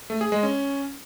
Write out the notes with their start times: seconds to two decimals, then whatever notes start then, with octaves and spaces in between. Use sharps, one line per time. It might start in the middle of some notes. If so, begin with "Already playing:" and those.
0.10 A3
0.21 G#4
0.32 G#3
0.43 C#4